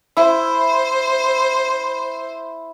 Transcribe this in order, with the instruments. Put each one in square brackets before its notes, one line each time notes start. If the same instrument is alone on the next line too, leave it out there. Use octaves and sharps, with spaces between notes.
[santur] E4 [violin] C5